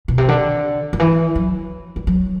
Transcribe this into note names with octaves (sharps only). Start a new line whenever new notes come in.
B2
C3
D3
D3
E3
F#3
G3
F#3